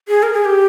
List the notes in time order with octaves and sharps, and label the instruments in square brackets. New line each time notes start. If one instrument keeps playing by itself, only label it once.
[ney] G#4
A#4
G#4
G4